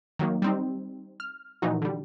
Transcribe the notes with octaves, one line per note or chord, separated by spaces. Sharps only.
D#3 F#3 A#3
G3 C4 D#4
F6
A#2 E3 F3 D#4 F#4
D3 G3